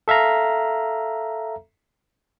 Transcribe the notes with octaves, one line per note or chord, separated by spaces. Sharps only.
A4 E5 F5 A#5